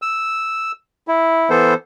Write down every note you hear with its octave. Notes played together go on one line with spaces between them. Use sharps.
E6
E4
E3 B3 A4 C5